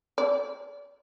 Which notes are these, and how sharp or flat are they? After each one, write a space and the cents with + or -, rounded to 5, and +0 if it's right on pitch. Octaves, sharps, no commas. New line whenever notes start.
D5 -40